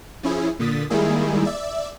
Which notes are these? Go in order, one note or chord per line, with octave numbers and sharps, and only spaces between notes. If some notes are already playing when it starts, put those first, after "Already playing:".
F3 C#4 E4 G#4
A#2 D3 D#6 A6 B6
D#3 G3 G#3 A#3 E4 G#4
D5 E5